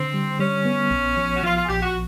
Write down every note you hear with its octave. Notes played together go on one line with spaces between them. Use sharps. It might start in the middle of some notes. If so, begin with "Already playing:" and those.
Already playing: D3 C4
G3
G3 C#4
B3
A#1
F3
F#4
F3 F4
F4
G#4
A#1 G4
F#4